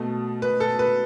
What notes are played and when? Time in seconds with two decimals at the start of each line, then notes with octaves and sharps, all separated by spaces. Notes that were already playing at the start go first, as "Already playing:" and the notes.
Already playing: B2 A3
0.42 B4
0.60 A4
0.79 B4